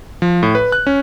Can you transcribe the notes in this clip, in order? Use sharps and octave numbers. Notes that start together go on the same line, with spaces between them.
F3
A2
B4
F#6
C#4